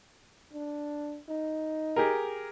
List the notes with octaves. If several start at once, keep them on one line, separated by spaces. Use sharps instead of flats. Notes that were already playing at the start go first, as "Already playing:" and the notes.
D4
D#4
G4 G#4 A#4